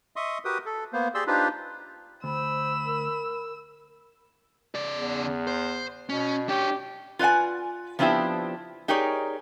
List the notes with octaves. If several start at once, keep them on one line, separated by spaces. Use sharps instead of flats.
D#5 E5 C6 C#6 D#6
F#4 G4 A#4 B4 D#6
A4
A#3 B3 C5
G4 G#4 D5 C6 E6
D4 D#4 F4 G4 B4 C5
D2 C5 B5 E6
A#4
C#3 D5
E2
C5
B2 C#4
D4 G4 C#5
F4 B4 D5 F#5 G#5
F3 B3 C4 D4 E4 G4
D#4 G4 G#4 A#4 C#5 D5